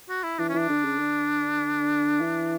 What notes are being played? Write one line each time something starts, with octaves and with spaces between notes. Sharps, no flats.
F#4
E4
E3 D4
C#4
E3 D4
D3
C#3
D3
E3